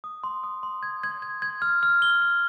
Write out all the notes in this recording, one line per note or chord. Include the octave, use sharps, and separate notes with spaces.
D#6
C6
D#6
C6
G#6
G#6
G#6
G#6
F6
F6
G7
F6